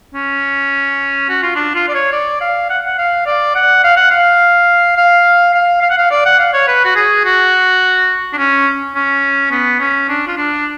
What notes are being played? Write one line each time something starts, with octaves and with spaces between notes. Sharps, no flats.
C#4
F#4
F4
D4
F4
D5
C#5
D5
F5
F#5
F#5
F5
D5
F#5
F5
F#5
F5
F5
F5
F5
F#5
F5
D5
F#5
F5
C#5
B4
F#4
G#4
F#4
D4
C#4
C#4
B3
C#4
D4
F4
D4